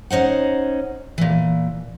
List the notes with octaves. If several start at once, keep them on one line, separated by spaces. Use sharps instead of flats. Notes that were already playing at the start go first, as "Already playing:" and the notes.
C#4 D#4 C5 F#5
A#2 E3